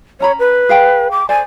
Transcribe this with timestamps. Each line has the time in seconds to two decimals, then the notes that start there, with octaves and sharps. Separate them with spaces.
0.20 C#4 C#5 A#5 B5
0.39 B4
0.69 G#4 F5 G5
1.11 D6
1.29 A4 C5 D5 G#5